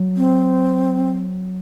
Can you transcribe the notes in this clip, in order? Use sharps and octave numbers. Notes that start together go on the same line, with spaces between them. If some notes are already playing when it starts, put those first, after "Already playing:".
Already playing: F#3
C4